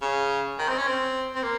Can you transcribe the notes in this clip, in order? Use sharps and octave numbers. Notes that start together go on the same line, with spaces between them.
C#3
D#3
C4
C#4
C4
C4
A#3